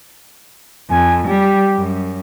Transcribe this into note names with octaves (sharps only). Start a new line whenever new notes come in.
F2 G#5
G3 G4
F#2